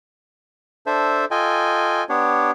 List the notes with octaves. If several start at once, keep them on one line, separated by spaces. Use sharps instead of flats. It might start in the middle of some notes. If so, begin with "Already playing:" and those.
D4 A4 C5 E5
F4 A4 D#5 G5 G#5
B3 D4 G4 C#5